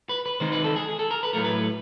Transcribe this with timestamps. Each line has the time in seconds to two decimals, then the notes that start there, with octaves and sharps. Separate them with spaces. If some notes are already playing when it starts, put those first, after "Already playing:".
0.09 B4
0.26 B4
0.40 D#3 G#3 C4 D#4 C5
0.52 B4
0.64 A4
0.76 G#4
0.88 G#4
0.99 A4
1.11 A#4
1.23 B4
1.33 A2 F#3 A3 A#4
1.45 B4